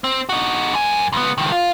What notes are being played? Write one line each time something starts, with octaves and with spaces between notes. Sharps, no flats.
C4
D#4 F#4
F#2 G#5
C#2 B3
C#2 D#3
F4